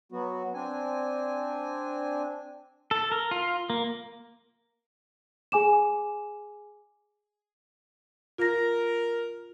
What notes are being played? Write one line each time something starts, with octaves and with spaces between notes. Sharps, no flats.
F#3 B3 F#4
C4 D4 G#5
A4
A#4
F4
A#3
G#4 G#5 D6 E7
F4 A#4 A#6